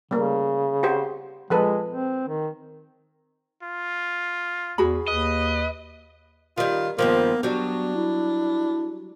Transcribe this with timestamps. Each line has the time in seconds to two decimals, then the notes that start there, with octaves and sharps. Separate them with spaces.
0.11 C#3 G3 A3 A#3
0.83 F#4 G4 C5
1.50 F3 G#3 A4 B4
1.89 C4
2.28 D#3
3.63 F4
4.78 E2 F#4 G#4 B5
5.08 D#2 B4 D#5
6.58 D#3 G3 F4
6.99 G2 D#3 F3 A#3 B3
7.43 F#3 G3 D4
7.96 E4